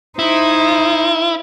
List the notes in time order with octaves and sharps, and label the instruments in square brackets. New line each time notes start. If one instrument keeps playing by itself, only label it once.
[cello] D#4 C5 [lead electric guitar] E4